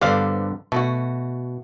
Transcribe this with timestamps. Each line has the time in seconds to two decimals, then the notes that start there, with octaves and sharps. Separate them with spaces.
0.01 G2 D3 B3 C5 D5 F5
0.72 B2 A3 F#4